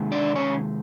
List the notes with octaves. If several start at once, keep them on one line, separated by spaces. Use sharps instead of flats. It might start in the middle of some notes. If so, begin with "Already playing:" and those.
Already playing: C3 D#3 G#3
D4 D5
C#4 C#5